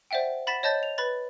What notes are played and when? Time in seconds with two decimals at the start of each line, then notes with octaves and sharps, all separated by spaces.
0.11 C5 D5 E5 F#5 G5
0.47 F#5 B5 A6 B6 E7
0.63 C#5 D#5 A5 G6 A6
0.83 F7
0.98 B4 B5 A6